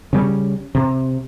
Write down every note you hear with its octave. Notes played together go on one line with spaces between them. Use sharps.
C#3 G3 A3 C#4
C3